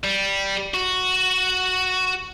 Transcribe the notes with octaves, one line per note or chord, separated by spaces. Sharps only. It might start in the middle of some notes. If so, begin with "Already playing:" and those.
G3
F#4